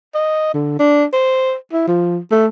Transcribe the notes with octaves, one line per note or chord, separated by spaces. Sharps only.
D#5
D3
D4
C5
E4
F3
A3